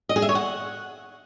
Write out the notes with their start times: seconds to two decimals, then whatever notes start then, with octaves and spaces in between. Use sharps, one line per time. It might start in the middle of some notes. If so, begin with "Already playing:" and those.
0.09 D#5
0.16 G#4
0.22 E5
0.29 C#5
0.35 F#5